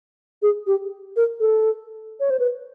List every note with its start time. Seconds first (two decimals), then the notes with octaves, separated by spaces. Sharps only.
0.42 G#4
0.67 G4
1.16 A#4
1.40 A4
2.20 C#5
2.30 C5
2.39 B4